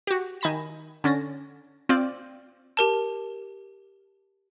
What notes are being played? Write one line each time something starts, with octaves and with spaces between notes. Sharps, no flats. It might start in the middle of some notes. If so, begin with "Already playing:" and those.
F#4 G4
D#3 G#5 B5 A#6 E7
D3 C#4 A6 A#6
C4 F4 D5
G4 A#4 A5